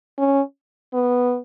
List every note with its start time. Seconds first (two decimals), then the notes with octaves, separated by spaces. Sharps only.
0.18 C#4
0.93 B3